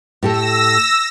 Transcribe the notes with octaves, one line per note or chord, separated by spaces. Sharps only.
A2 G4 A4 E6 A#6